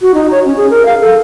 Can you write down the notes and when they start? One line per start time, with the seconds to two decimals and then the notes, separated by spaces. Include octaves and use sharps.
0.01 F#4
0.14 D#4
0.31 C#5
0.45 C#4
0.57 G#4
0.70 A#4
0.85 F5
1.01 A4